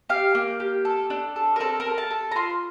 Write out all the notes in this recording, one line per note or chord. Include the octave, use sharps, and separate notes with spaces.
G4 F5
A#3
G4
A4
D4
A4
A#4
C4 A4
A#4
A4
A5
A4
A#5
F4 C6